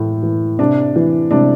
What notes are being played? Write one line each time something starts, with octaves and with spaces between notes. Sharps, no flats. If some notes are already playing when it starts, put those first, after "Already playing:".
Already playing: A2 E3
E3
C3 D4
E3
C3 D4